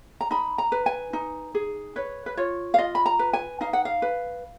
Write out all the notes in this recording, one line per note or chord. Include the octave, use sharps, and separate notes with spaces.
A#5
D#4 B5
A#5
B4
G#5
D#4
G#4
B4 C#5
B4
F4 C#5
F5
F4 D#5
B5
A#5
B4
G#5
D#4 F5
F#5
F5
B4